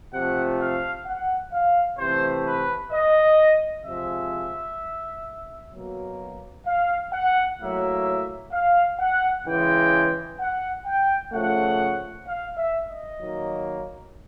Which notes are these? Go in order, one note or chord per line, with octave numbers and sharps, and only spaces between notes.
C3 F3 A3 F#5
F5
F#5
F5
C3 E3 A3 C5
B4
D#5
C3 F3 G#3 E5
B2 F#3 A#3
F5
F#5
A2 F#3 A#3 E5
F5
F#5
C#3 E3 G#3 G5
F#5
G5
C#3 F3 A3 F#5
F5
E5
D#5
D#3 F#3 A#3